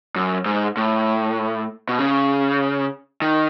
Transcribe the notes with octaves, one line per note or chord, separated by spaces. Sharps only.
F#2
G#2
A2
B2
C#3
D#3